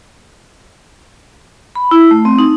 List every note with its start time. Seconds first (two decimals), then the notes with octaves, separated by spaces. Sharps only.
1.75 B5
1.91 E4
2.11 A3
2.25 C4
2.39 D#4